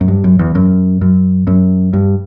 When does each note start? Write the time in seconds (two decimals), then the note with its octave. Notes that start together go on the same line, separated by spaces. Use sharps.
0.01 F#2
0.08 G2
0.24 F#2
0.39 E2
0.55 F#2
1.01 F#2
1.47 F#2
1.93 G2